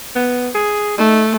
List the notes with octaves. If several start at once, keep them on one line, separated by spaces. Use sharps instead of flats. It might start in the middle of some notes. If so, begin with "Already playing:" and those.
B3
G#4
A3 D#4